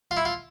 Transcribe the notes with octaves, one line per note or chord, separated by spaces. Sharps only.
F4
E4
F4